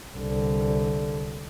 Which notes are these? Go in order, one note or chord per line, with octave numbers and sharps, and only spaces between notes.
C2 D3